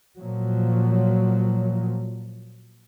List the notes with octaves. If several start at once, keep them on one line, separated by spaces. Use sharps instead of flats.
A#2 F3 F#3